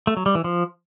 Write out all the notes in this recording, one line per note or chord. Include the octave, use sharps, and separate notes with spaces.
A3
F#3
G3
E3
F3